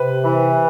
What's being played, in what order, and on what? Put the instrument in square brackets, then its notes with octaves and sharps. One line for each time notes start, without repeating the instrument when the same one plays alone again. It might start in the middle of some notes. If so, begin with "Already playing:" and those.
Already playing: [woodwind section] C3 [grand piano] B4
[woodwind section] E3